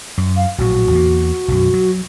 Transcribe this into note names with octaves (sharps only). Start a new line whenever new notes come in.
F#2
F5
A#1 A2 F#3 F#4
E2 A#3
B1 F#2
F#3